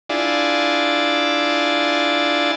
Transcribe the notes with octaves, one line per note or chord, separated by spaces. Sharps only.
D4 E4 F4 G#4 D5